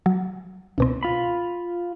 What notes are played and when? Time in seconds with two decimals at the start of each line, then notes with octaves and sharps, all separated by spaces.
0.06 F#3
0.78 C#2 B2 C4
1.03 F4 B5